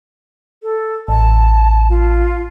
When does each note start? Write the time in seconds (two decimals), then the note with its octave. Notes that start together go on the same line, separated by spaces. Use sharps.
0.63 A4
1.08 A1 A5
1.90 F4